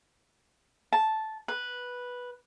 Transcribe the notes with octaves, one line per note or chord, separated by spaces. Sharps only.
A5
B4